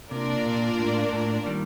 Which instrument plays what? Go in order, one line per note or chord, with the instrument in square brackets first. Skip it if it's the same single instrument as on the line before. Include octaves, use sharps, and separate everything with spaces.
[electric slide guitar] C3 [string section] A#3 D4 F4 A#4 D5
[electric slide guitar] A#2
A2
A2
D#3 G3